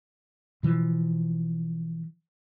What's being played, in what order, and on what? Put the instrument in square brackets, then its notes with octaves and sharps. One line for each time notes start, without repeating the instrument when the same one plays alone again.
[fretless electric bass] B2 E3 F3